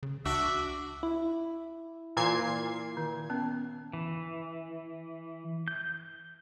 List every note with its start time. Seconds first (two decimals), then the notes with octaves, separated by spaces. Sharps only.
0.03 C#3
0.25 C#2 D4 F#4 E5
1.03 E4
2.17 A#2 E3 G#5 G#6 C7
2.97 D#3
3.30 B3 C#4
3.93 E3
5.68 G6